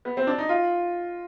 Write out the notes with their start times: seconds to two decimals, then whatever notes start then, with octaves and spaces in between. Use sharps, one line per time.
0.05 B3
0.17 C4
0.27 D4
0.38 D#4
0.49 F4